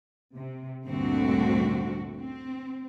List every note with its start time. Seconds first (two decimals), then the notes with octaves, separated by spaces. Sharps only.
0.36 C3
0.87 D2 G2 A#2 D3 C4 F#4
2.17 C4